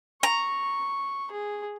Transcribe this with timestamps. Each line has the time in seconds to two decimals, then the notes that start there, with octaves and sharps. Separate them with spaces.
0.23 A#5 C#6
1.32 G#4